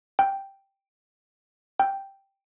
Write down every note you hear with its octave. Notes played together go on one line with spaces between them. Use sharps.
G5
G5